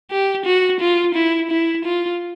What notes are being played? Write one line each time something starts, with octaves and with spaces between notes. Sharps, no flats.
G4
F#4
F4
E4
E4
F4